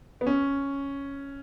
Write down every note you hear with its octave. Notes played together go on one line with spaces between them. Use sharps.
B3
C#4